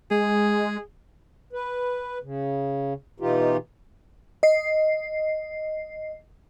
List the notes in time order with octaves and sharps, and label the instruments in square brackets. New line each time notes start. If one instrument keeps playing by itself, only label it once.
[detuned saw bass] G#3 [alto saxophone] G#4
[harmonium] B4
C#3
B2 E3 D#4 F4 G4
[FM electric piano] D#5 C7